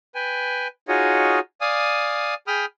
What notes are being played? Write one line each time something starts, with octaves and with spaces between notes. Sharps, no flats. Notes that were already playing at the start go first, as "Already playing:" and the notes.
B4 G5 G#5
D#4 F4 F#4 G#4 C#5 D#5
D5 F5 G#5 D#6
G#4 G5 B5 D#6 F6